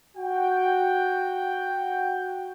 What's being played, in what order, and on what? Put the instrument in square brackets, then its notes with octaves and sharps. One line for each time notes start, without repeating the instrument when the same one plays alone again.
[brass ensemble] F#4 G5